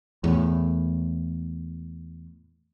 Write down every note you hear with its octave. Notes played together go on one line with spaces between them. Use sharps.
E2 A2